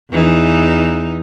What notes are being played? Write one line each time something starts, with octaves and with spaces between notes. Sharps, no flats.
E2 E3 D#4